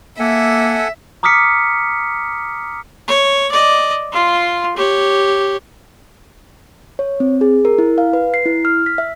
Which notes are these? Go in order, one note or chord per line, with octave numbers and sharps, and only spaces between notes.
A#3 A4 E5 F#5 G#5
A#5 D6 D#6 F6 B6 C#7
C#5
D5 D#5
F4 C6
G4 C#5
C#5
C4
G#4
A#4
E4
F5
B4
C7
E4
F6
B6
E5